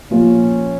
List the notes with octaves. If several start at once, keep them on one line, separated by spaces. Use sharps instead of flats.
A#2 F3 A#3 C#4 F4